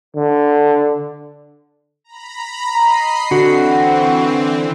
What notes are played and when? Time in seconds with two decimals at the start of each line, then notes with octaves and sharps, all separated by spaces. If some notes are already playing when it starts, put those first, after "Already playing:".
0.15 D3
2.04 A#5 B5
2.75 D#5 A#5 B5 C7
3.31 D3 E3 C4 F#4